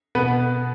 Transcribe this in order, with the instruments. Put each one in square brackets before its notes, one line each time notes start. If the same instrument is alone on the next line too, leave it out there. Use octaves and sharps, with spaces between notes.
[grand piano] B2 B3 B4